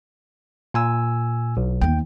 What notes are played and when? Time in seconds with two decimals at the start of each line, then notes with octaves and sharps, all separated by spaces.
0.74 A#2 G#5 E6
1.57 B1
1.82 D#2 B3 G5